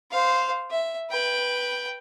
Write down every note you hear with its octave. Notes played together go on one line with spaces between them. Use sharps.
C5 F5
E5
B4 G5